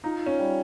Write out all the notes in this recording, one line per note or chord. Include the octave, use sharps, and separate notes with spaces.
D#4 F4
C#4
G3